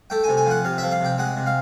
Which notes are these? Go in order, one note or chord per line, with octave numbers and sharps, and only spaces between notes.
A3 G5
G#5
C3
G#5
F3 F#5
C3 F5
F3 E5
F5
C3 G5
G#3 F#5
C3
F5